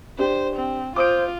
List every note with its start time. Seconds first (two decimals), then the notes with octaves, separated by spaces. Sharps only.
0.19 D4 G4 C5
0.56 C4
0.96 F4 C5 D6 D#6 D7